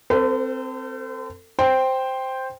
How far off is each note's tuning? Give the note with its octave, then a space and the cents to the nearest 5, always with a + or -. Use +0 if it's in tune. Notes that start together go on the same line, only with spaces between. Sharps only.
C4 +0 A4 +35 C5 -40
C5 +0 G5 +0